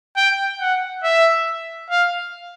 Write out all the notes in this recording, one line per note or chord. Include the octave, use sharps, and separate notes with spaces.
G5
F#5
E5
F5